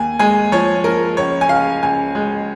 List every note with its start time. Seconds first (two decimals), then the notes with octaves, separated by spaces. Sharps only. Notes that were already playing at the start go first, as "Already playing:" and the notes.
Already playing: D#2 G#5
0.19 G#3 G#5
0.52 F3 C#5
0.84 F3 A#4
1.17 C#2 C#5
1.41 G#5
1.49 C#2 F5
1.83 C#2 G#5
2.15 G#3